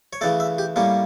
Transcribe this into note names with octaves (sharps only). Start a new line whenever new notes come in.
C#5
C#3 E3 A3 D5
E5
G4
A2 G3 A#3 C#4